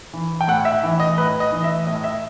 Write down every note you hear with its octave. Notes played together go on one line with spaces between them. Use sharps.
E3
G5
A2 F#5
E5
E3
D#5
A2 B4
D#5
E3
E5
A2 D#5
E5